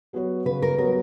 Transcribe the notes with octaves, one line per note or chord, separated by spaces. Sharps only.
F#3 B3 F#4 C#5
C#3 B4
A#4
F#3 B3 F#4 A#4 C#5